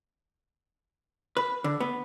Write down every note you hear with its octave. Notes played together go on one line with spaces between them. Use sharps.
B4
D3
B3